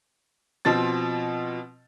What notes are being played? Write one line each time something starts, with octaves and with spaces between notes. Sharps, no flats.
B2 F3 C4 A6